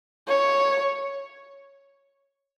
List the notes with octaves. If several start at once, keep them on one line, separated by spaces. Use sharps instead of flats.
C#5